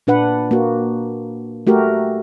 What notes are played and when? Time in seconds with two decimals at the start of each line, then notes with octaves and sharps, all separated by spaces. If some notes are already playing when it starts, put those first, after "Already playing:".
0.07 A#2 D4 B4 F#5
0.51 A#3 F#4
1.67 A3 F#4 G4 A#4